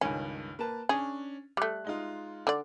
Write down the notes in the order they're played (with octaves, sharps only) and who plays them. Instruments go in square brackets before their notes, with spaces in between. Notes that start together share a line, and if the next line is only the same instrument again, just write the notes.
[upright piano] C#2 G2 D#3 [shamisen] C#4
[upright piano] A#3 B4 A5
[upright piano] C#4 D4 [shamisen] G#4
[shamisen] G3 A3 [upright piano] F#6
[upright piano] G#3 D#4 F4
[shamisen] D3 D5